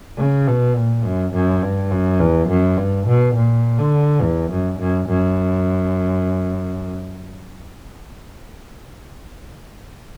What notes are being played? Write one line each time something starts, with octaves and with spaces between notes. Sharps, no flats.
C#3
B2
A#2
F#2
F#2
G2
F#2
E2
F#2
G2
B2
A#2
D3
E2
F#2
F#2
F#2